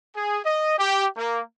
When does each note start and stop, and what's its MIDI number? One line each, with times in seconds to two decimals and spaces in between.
0.16 0.40 68
0.45 0.78 75
0.79 1.07 67
1.17 1.41 58